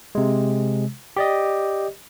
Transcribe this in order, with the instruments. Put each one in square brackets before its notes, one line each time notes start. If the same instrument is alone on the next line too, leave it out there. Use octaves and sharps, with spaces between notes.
[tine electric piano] C3 G#3
G4 D5 D#5